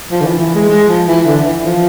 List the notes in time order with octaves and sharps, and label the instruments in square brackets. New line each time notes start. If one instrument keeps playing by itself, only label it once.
[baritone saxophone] F3
D3
E3
E3
G#3
G#3
F3
E3
D3
E3
F3